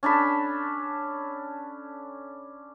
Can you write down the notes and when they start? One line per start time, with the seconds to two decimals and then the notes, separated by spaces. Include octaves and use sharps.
0.03 C#4 D4 A4 B5